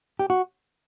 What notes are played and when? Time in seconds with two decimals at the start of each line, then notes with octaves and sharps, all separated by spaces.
0.19 G4
0.30 F#4